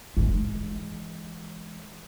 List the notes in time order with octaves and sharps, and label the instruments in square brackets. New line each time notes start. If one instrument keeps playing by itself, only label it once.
[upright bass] E3 G#3